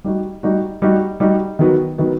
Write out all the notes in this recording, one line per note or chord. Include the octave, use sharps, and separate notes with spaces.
G3 D#4 F#4
G3 D#4 F#4
G3 D#4 F#4
G3 D#4 F#4
D#3 F#3 B3 F#4
D#3 F#3 B3 F#4